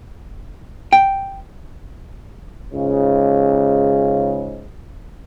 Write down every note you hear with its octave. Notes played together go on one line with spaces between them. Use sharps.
G5
C#2 G#2 C#3